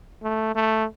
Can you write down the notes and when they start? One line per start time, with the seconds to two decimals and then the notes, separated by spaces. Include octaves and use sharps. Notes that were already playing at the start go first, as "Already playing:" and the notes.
0.23 A3
0.55 A3